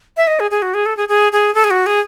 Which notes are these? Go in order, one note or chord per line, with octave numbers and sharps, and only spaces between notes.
E5
D#5
G#4
G#4
F#4
G#4
A4
G#4
G#4
G#4
A4
G#4
F#4
G#4